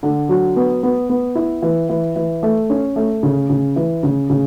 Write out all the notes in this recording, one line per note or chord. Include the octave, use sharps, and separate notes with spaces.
D3
F#3
B3
B3
B3
E4
E3
E3
E3
A3
C#4
A3
C#3
C#3
E3
C#3
C#3